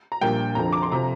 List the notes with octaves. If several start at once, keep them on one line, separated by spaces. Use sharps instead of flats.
A#5
A#1 A#2 G3 G5
F1 F2 D3 F3 A#5
D6
C6
C3 F3 A#5